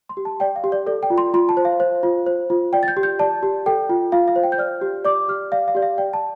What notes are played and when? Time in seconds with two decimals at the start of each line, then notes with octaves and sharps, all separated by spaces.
0.09 C6
0.17 G4
0.25 A5
0.40 D5 G5
0.56 F5
0.64 G4
0.72 D5
0.86 A4 D5
1.03 G5
1.10 F4
1.18 C6
1.34 F4 C6
1.49 A5
1.57 C5
1.65 F5
1.80 C5
2.03 F4
2.26 C5
2.50 F4
2.73 D5 G5
2.83 A6
2.88 G6
2.97 G4
3.03 G6
3.19 D5 A5
3.43 G4
3.66 A4 G5
3.89 F4
4.12 F4 F5
4.28 F5
4.36 C5
4.43 G5
4.52 G6
4.58 D5 F6
4.82 G4
5.05 D5 D6
5.28 G4 F6
5.52 D5 F5
5.68 F5
5.75 G4 D5
5.82 F5
5.98 D5 G5
6.13 A5